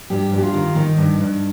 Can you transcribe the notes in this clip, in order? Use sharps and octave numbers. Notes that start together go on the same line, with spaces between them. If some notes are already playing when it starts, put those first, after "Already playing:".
G2 G4
G2
G4
F4
D#3
D#3 D#4
G2
G2